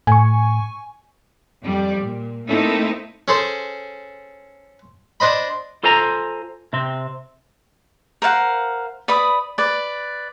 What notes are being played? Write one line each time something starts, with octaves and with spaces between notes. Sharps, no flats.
A2 G#5 C#6
F2 G3 D5
A#2
A3 A#3 C4 D#4 E4 A4
C#4 G#4 A4 C5
D4 C5 D#5 B5
F4 A4 C5 G#5 A#5
C3 C4
A#4 C5 F5 F#5
B4 D5 B5 D#6
B4 D5